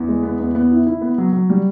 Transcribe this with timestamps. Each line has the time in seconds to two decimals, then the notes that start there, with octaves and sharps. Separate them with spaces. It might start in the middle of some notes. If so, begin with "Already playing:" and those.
Already playing: E2
0.08 G#3
0.23 B3
0.39 E2
0.55 B3
0.71 E4
0.86 E4
1.01 B3
1.18 F#3
1.33 F#3
1.50 G3